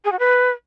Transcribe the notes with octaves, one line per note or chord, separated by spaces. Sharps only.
G#4
F#4
B4